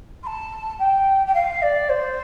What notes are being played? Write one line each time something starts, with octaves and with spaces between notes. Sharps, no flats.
C6
A5
G5
G5
F5
D5
C5